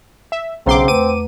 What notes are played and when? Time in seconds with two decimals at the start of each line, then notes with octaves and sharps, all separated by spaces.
0.32 E5
0.66 B1 C#3 C4 F#5 A#5 C6 D6
0.88 E2 A3 B4 D6 D#7